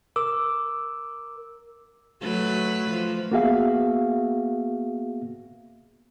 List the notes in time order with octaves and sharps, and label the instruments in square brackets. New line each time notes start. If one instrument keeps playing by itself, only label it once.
[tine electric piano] A#4 D6 E6
[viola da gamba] F#3 A3 B4
F3
[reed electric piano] A#3 B3 F#4 G#4 E5 F5